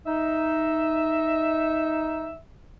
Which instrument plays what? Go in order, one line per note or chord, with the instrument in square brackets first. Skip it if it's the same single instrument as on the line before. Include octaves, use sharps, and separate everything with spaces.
[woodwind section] D#4 [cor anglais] E5